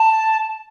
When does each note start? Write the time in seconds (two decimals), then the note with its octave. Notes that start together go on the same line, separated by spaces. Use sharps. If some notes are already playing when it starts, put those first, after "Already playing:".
Already playing: A5